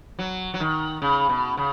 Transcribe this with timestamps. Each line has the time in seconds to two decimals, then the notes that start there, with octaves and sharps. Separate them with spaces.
0.19 F#3
0.54 F#3
0.60 D#3
1.02 C#3
1.29 B2
1.57 C#3